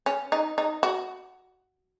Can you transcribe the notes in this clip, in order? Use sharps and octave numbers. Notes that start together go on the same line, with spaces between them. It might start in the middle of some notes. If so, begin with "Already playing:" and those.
C#4
D#4
D#4
F#4